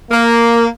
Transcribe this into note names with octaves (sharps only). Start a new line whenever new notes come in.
A#3